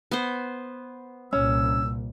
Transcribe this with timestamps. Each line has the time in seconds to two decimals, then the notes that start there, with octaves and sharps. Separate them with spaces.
0.11 B3 C5
1.33 C2 A#2 C#4 E6